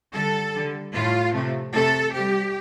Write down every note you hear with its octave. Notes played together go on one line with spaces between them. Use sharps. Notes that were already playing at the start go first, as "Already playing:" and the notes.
D3 G3 A4
D3 G3
A2 A3 F4
C3 F3 A3
C3 A3 A4
C3 G3 G4